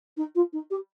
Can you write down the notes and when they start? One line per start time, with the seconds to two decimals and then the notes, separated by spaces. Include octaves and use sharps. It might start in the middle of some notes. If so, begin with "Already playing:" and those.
0.16 D#4
0.35 F4
0.52 D#4
0.70 G4